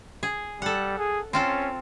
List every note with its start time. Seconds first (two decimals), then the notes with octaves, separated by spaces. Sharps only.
0.23 G#4
0.62 G3 A4 F#5
0.98 G#4
1.33 C4 C#4 F4 A4